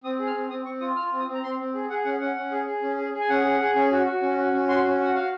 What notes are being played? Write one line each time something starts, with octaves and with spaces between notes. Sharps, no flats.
C4 D#6
G#4
F6
C4
C4 D#6
C4 C#6
F4 D#6
F4 F6
C4
D#6
C4
A#5
C4 C6
C4
G#4
G#4 F#5
C#4 F#5
C#4 F#5
C#4
G#4
G#4
C#4
G#4
G#4
G#5
C#4 F#5
G#4
G#4
C#4
F#4
F#4
C#4
F#4
C#4
F#4 C6
C#4
F#4 F#5
F#4 F5